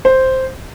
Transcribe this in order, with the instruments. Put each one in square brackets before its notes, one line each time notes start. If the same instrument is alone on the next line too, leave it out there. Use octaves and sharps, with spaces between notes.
[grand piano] C5